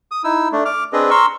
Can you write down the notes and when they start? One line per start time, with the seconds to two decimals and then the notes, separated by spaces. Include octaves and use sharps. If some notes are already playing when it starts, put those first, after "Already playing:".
0.11 D#6
0.24 D#4 E4 E6
0.52 A3 D4
0.65 D6 F6
0.93 C4 D4 G#4 B4 D#5
1.10 A#5 C6 C#6 E6 F6